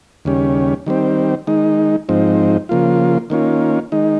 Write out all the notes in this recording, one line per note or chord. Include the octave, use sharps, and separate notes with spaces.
D#2 C#3 G3 C#4
D#3 G3 C4
D#3 G#3 D#4
G#2 F3 C4 D#4
C#3 F3 A#3 F4
D#3 A#3 C#4 F4
D#3 G#3 D#4